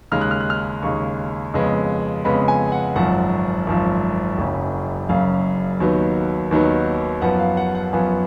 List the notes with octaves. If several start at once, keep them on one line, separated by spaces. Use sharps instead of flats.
D#2 C#3 G#3 F6
F#6
F6
F#6
F6
D#2 C#3 G#3 C#6
F2 C#3 G#3 B3
F2 C#3 G#3 B3 B5
G#5
F#5
G#1 F#2 F3 F#5
G#1 F#2 F3
F#1 F#2 C#3
F#1 F#2 C#3 F5
D#2 D#3 F#3 B3
D#2 D#3 F#3 B3
F#2 F3 B3 F#5
F5
F#5
F#5
F#2 F3 B3 G#5